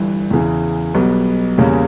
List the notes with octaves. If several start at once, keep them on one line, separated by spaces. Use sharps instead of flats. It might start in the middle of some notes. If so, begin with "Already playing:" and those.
Already playing: G1 G2 E3
E2 C#3 E3
B1 B2 G3 B3
E2 C#3 G3 A#3 C#4